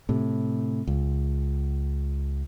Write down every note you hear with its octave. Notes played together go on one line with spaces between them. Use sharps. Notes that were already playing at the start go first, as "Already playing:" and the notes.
A2 C3
C#2